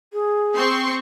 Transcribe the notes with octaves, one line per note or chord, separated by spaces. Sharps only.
G#4
C4 C6 C#6